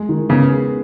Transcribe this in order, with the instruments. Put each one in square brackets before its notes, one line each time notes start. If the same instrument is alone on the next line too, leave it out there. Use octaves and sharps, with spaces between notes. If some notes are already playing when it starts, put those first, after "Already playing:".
Already playing: [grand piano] G#3 G#4
D#3
[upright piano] C#3 [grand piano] B3
[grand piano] G#4